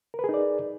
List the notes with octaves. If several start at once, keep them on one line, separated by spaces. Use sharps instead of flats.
D#4 G#4 A#4 B4 D5